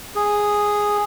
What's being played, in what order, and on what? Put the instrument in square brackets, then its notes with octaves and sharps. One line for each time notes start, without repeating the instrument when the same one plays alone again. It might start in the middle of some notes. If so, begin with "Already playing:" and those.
[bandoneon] G#4